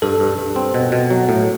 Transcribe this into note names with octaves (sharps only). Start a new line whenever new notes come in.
G2 A4
G2
G2
C4
B2
B2
F#3
A2